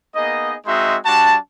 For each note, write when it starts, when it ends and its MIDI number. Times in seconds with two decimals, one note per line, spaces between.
0.16 0.55 58
0.16 0.55 59
0.16 0.55 63
0.16 0.55 68
0.16 0.55 75
0.67 0.97 56
0.67 0.97 60
0.67 0.97 63
0.67 0.97 66
0.67 0.97 76
0.67 0.97 84
1.06 1.36 55
1.06 1.36 62
1.06 1.36 66
1.06 1.36 81